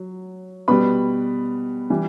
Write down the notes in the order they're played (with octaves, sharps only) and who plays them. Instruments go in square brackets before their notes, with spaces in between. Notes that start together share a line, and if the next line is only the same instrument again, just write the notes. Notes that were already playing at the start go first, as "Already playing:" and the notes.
Already playing: [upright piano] F#3
B2 G3 B4 B5
E3 G3